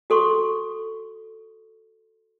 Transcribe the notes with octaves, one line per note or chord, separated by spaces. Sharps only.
F#4 A4 C6 C#6